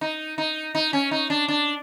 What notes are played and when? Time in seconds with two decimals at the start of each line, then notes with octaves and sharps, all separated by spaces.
0.01 D#4
0.38 D#4
0.75 D#4
0.93 C#4
1.11 D#4
1.30 D4
1.48 D4